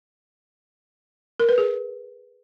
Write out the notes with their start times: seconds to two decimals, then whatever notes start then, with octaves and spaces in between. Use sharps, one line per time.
1.40 A#4
1.49 B4
1.58 G#4